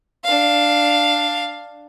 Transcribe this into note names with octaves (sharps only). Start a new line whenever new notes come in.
D4 F5